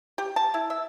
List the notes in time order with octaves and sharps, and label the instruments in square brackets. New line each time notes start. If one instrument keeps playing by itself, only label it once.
[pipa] G4
A5
E4
E5